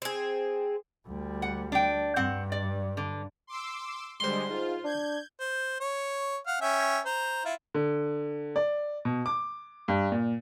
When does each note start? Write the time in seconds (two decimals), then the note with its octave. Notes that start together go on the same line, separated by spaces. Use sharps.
0.02 C4 G#4
1.07 D2 G3
1.42 F#5
1.72 D4 G5
2.16 G2 C4 F#5
2.52 D5
2.97 D3
3.47 C6 D6 E6
4.20 D3 G3 G#3 C5 C6
4.50 G#2 F4
4.84 D4 G6 G#6
5.40 C5
5.80 C#5
6.47 F5 F#5
6.61 C#4 E5 G5
7.06 C5 A#5
7.45 E4 F4
7.74 D3
8.56 D5
9.05 B2
9.26 D6
9.88 G2
10.12 A#2